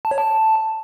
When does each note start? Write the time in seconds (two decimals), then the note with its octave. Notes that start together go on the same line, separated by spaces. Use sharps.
0.05 A5
0.11 C#5
0.18 A5